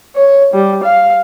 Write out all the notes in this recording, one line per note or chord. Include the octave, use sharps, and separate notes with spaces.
C#5
G3
F5